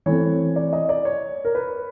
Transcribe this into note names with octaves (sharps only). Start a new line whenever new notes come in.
E3 A3 C4 C#5
D5
D#5
D5
C#5
A#4
B4